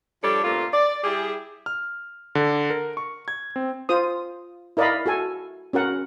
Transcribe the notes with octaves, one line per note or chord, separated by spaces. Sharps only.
F3 G3 D4 G4 A4 C#5
G2 A#2 A3 C4 F4
D5
G3 E4 G4 G#4
F6
D3
A#4
C#6
G#6
C4
F4 C5 D#6
E4 A#4 D5 D#5 F5 B5
F#4 A4 G#5
C#4 F#4 A#4 F#5